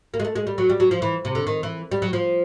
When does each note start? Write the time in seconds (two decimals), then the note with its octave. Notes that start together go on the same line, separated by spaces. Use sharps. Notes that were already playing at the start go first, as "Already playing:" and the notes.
0.14 A#3
0.20 G#3
0.25 A3
0.36 G#3
0.47 G3
0.58 F#3
0.69 G3
0.80 F#3
0.91 F3
1.02 E3
1.25 C3
1.35 D3
1.47 D#3
1.63 E3
1.91 G3
2.02 F#3
2.13 F3